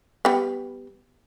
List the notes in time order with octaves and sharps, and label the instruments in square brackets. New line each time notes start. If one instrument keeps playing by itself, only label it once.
[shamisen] G3 B3